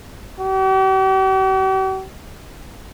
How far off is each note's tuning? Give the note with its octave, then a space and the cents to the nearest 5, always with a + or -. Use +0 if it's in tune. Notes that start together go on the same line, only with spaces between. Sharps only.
G4 -45